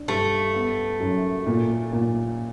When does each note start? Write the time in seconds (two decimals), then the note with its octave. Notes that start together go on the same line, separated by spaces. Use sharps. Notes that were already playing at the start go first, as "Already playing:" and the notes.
Already playing: D4
0.08 G2 A3
0.54 B3
1.00 F#2
1.46 A#2
1.93 A#2